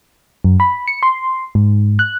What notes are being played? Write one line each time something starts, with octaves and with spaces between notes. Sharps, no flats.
F#2
B5
C#7
C6
G#2
F#6